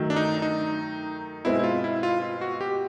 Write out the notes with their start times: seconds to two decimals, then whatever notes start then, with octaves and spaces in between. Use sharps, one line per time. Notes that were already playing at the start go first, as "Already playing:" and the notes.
Already playing: D#3 F#3 A3
0.10 D4
0.16 D#4
0.42 D#4
1.45 B2 G#3 C4 E4
1.59 E4
1.64 F4
1.84 E4
2.03 F4
2.22 F4
2.41 F#4
2.61 G4